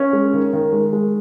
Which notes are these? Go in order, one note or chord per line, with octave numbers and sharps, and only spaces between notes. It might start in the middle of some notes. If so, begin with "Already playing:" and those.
Already playing: C#4
G#3
D#3
D#3
G#3
G#3